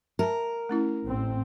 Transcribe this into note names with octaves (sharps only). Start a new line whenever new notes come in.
A#4 E5 A5 A#5
A3 C#4 E4
A1 C4